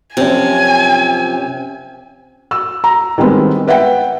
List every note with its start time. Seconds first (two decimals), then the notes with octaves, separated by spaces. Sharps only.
0.17 F#2 C3 F3 C#4 G#5
2.51 E6
2.84 A#5
3.18 D#3 G3 G#3 B3 C4
3.67 B4 E5 F#5 G5